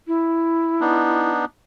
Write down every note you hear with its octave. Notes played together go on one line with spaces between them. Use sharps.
E4
B3 D4 D#4